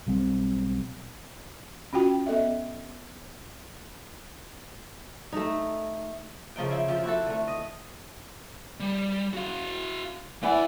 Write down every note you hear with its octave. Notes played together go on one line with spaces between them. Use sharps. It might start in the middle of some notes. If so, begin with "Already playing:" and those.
B1 G3 C4
C#4 F4 F#4 G5
B3 A4 D#5 E5
A3 D#4
C#3 F3 D#4 G5
E4
F3 C4 G4
E4 F#4 A4
D3 A3
D#5
G3
F#4 F5
E3 A3 D5 F#5